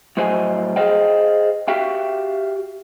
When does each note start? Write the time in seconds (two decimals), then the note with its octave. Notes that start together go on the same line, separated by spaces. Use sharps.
0.17 A2 F3 F#3 C5 D#5 G#5
0.76 G#4 C5 D#5 F5 G5
1.68 F#4 G4 E5 F5 G5